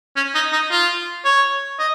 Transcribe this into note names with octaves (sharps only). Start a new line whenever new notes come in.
C#4
D#4
D#4
F4
C#5
D#5